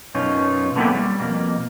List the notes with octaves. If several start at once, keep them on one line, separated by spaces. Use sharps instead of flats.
F#2 B2 C#4 D#4 F4
D3 A#3 B3 E4 G4
G3
F2 B2 A#3